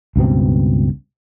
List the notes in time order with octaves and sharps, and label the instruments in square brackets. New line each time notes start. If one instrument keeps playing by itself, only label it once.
[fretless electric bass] C#2 G2 B2 C4